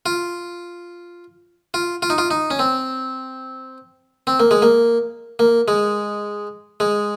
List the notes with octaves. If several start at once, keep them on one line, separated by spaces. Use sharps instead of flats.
F4
F4
F4
D#4
F4
D#4
C#4
C4
C4
A#3
G#3
A#3
A#3
G#3
G#3